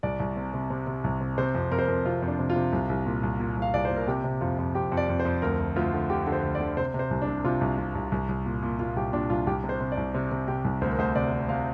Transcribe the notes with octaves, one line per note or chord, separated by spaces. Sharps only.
C2 D5
C2
C3
C3
C3
C3
C2
C3
C3 C5
F2
F2 A#4
C5
F2 A#4
C3 F4
F2
D4
C3
F4
C3
C2
C2
A#2
C2
A#2
C2 F5
C2 D5
C5
A#2
A#4
C3 G4
C3
F2 F4
F2
F2 G4
F2
D5
F2
C5
F2
D2 A#4
D2
D2 F4
D3
D3 G4
D3
C5
D2
D5
D3
C3 C5
C3
C5
C2
D4
C3
C3 F4
C2
C3
C2
C2
C2
A#2
A#2
A#2 F4
C2 G4
A#2 D4
C2 F4
C2 G4
C3
C5
C3
D5
C2
C3
C3
C3 G4
C2
D2 C5
A#4
D2 C5
C3 D5
C3
C3 F5